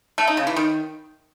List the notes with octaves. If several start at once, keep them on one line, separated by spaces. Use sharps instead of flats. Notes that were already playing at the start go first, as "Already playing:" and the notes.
A3
D#4
C#3
E3
D#3